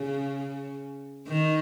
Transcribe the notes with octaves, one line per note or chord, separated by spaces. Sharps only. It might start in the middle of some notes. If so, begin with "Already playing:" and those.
Already playing: C#3
D#3